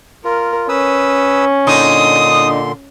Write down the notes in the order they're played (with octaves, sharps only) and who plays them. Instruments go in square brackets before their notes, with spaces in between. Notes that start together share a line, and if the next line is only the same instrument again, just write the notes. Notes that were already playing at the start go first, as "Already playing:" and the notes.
[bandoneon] F4 [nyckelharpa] A#4
[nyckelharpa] C#4 [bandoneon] B4 D#6 E6
[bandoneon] A#2 D3 C6 [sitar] D4 D#4 [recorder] D#6